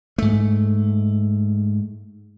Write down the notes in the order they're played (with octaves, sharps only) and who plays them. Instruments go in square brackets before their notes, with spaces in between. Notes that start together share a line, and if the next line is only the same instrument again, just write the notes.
[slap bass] G#2 A3